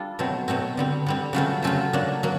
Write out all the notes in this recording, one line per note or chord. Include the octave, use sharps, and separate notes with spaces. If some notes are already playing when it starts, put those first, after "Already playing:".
Already playing: G3 D4 F4 A4
B2 F#3 A3 C4
B2 F#3 A3 C4
D3 G3 C4
D3 G3 C4
C#3 F#3 A3 C4 F4
C#3 F#3 A3 C4 F4
F#3 A#3 D4
F#3 A#3